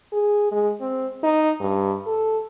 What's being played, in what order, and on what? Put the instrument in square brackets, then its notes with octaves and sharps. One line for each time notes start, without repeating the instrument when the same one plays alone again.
[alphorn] G#4
G#3
C4
D#4
G2
A4